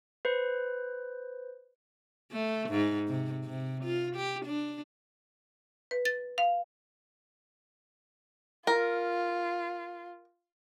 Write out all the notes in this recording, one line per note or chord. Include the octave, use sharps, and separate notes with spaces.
B4 C5
A3
G#2
C3
C3
F4
G4
D4
B4
A6
F5
F4 A#4